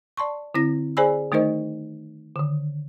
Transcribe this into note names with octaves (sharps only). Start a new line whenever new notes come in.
D5 A5 C6 C#6
D3 C4 E4 A#6
G#4 C5 D5 G#5 B5 E6
D#3 A3 D#4 A#4 C5 D#5
D3 D#3